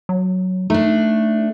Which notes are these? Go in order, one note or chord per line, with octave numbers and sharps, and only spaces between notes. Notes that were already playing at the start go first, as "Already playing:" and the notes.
F#3
A3 D4 D#4